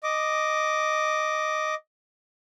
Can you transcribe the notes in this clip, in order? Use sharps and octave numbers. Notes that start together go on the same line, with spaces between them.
D#5 D6